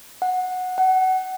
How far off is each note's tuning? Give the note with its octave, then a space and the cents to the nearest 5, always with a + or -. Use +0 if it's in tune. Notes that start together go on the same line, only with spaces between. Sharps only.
F#5 -10
F#5 +25